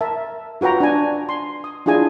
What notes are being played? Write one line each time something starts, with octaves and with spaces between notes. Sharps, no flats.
A#4 E5 A5
F4 F#4 B4 G5 A#5
D4 G#5
C6
D#6
D4 E4 F4 G#4 G#5